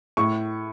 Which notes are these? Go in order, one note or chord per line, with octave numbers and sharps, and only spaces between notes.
A2 C#6